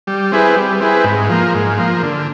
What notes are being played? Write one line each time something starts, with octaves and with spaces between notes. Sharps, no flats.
G3
C4 E4 G#4 B4
G3
C4 E4 G#4 B4
G#2
F3 A#3
G#2
F3 A#3
D3